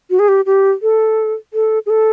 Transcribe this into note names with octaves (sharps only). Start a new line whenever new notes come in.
F#4
G#4
G4
G4
A4
A4
G#4
A4